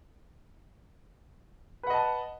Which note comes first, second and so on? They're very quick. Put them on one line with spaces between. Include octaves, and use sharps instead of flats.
B4 F#5 D#5 A5